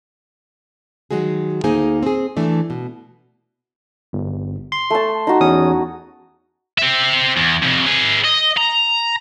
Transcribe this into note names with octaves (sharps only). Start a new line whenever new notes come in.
D#3 F#3 G#3 F#4 G#4
D2 A#3 D#4 G#4 C5 G#5
C4 G#4
E3 A3 D4
B2
G1
C6
A3 A5
D#4 F#4
E2 C#4 D#6
C4 E5
E2
F2 C3
G#4 B4
D#5
A#5